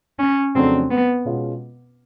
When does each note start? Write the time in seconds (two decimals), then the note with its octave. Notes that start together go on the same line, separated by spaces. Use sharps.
0.19 C#4
0.55 F2 C#3 F#3 A3 C4 D4
0.91 B3
1.25 B2 G#3 C#4 F4